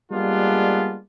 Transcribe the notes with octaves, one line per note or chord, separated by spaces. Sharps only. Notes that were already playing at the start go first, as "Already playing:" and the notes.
G3 G#3 A#3 B3 D4 F4